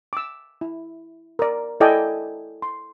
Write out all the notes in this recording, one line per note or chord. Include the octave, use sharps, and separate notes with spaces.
D6 E6
E4
A#4 D5
E4 A4 D5 D#5 G5 G#5
C6